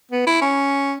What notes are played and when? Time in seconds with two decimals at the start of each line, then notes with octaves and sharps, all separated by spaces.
0.11 B3
0.27 E4
0.41 C#4